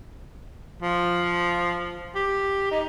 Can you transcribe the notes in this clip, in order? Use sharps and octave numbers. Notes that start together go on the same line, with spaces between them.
F3
G4
D#4